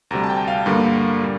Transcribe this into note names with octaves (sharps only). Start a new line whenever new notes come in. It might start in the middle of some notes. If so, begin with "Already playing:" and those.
D2 C3 G3 A#5
A5
G5
F5
G2 D3 G3 A#3
A#2 G3